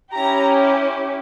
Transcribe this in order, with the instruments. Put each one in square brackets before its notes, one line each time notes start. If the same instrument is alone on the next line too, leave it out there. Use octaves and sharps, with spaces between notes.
[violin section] C#4 E4 G4 A#5